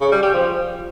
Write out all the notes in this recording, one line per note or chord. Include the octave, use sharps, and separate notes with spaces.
C#3
G3
G4
F3